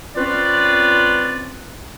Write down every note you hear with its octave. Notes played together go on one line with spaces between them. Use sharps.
C4 C#4 F4 B4 D5